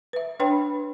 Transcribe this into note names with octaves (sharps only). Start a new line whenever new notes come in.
B4 E5
D4 B4 C#5 G5 B5